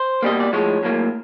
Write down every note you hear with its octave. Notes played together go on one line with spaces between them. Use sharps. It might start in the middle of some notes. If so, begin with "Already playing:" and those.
Already playing: C5
B2 G3 A#3 D#5
D5
A2 F3 G#3 C#5
A2 F#3 A#3